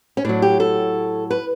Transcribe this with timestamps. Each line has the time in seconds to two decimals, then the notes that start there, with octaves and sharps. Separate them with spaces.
0.17 C#4
0.24 A2 F#3 D4
0.42 G4
0.60 A4
1.31 B4